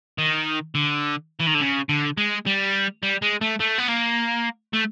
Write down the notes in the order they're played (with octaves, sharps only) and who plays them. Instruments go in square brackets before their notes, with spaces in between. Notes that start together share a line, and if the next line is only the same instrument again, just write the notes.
[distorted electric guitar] D#3
D3
E3
D#3
D3
C#3
D3
G#3
G3
G3
G#3
A3
A3
B3
A#3
A3